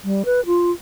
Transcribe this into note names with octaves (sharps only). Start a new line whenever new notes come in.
G3
B4
F4